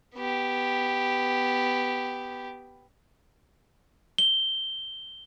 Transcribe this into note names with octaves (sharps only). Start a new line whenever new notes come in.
B3 G4
G7